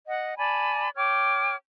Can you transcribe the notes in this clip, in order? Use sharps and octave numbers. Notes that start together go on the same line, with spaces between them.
D#5 F#5
D5 G#5 A5 B5
C#5 G5 D6 F6